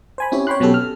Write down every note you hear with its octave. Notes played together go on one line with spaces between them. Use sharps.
C5 G#5 B5
C4 C#4 E4 G4 C#5
C#5 G5 B5 C6 F#6
B2 F#3 B3 C#4 G4 A4
F6